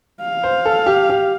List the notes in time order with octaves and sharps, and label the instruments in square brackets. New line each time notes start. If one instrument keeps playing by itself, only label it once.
[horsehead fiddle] F5
[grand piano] C5
A4
G4
G4